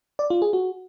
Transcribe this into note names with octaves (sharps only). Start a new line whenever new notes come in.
D5
F4
G#4
F#4